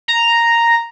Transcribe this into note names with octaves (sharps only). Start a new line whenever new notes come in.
A#5